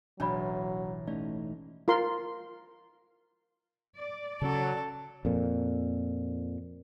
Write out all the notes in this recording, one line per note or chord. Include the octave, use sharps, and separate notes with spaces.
E1 A1 F#3 D4 D5 B5
A3 C#4 D#4 D5
F4 A#4 C6
D5
C#3 F#3 C#4 A4
F2 A#2